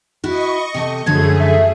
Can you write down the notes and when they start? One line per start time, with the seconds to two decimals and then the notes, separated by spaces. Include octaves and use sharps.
0.24 E4 F#4 D#5 C#6
0.74 C3 A3 A4
1.06 F#2 D3 F3 F#3 A3 G#4 G#6
1.40 E5